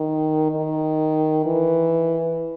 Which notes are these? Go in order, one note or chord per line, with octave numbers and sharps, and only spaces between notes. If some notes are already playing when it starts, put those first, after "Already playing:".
Already playing: D#3
D#3
E3